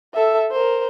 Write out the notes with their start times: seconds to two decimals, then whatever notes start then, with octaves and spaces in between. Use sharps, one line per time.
0.14 A4 E5
0.51 A#4 C5